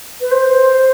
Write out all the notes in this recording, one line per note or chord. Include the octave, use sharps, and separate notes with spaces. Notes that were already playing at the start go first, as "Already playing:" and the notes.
B4
C5